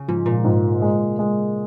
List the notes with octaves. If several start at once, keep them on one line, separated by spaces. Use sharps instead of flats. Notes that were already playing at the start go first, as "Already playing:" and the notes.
Already playing: C#3
G#2 F3
A#2
G#2
G#3
G#3